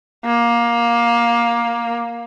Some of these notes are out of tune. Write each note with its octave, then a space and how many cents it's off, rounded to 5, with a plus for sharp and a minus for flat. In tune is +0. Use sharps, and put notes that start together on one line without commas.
A#3 +15